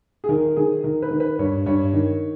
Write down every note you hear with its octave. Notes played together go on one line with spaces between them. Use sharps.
G#4
D#3 A#4
D#3 G#4
D#3 A#4
B4
D#3
B4
G2 C#5
G2 C#5
D#3